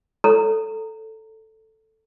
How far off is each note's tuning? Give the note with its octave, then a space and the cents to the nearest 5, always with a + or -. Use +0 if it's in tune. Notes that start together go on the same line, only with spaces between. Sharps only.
A4 +0 C#5 -10 A#5 -20